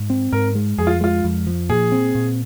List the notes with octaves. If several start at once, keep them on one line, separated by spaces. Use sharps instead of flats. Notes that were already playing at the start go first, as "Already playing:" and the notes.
Already playing: G#2
C4
G#2 A#4
G#3
F2 G#4
F4
G#3 F4
F2
F3
A#2 G#4
C4
A#2